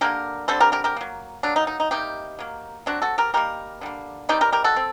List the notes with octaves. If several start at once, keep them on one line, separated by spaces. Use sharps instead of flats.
D3 G3 A#3 G4 A#4
D3 G3 C4 A4 C5
G4 A#4
G4 A#4
G4 A#4
F#3 A#3
F#3 A#3 D4
D#4
D#4
D#4
C3 G3 A#3 D#4 G4
F#3 A#3
F#3 C4 D4 F#4
F#4 A4
G4 A#4
D#3 G3 A#3 G4 A#4
D3 G3 A#3
D#3 G3 C4 D#4 G4
G4 A#4
G4 A#4
F#4 A4
C4